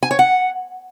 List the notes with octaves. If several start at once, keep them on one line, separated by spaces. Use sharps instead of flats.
G#5
C#5
F#5